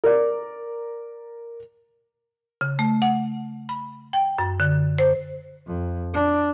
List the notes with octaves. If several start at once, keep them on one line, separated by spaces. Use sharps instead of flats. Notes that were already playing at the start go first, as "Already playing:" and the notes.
A#4 D5
C#3
A3
F#5
B5
G5
F#2
D3
C5
F2
D4